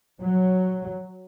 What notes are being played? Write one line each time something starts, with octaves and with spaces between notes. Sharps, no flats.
F#3